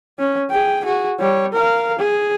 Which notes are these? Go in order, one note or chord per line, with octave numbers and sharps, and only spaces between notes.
C#4
G#4 G5
F#4 G#4
G3 C#5
A#4 F5
G#4